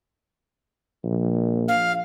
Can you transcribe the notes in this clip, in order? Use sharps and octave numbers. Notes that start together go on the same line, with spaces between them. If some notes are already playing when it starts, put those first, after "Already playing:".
A#1
F5